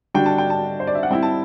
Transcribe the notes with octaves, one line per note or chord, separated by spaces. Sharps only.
D3 G3 D4 F#4 G5
A5
G5
A5
C5
D5
E5
F#5
G3 C4 E4 G5
A5